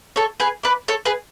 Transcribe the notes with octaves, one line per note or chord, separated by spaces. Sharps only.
A4 C#5
G#4 B4
B4 D5
A4 C#5
G#4 B4